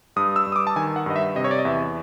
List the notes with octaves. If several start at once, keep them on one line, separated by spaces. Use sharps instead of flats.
G2 D#6
E6
G2
D#6
D6
A5
D#3 G#5
F#5
G2 D#5
E5
C3 D#5
C#5
D5
D#5
E2 E5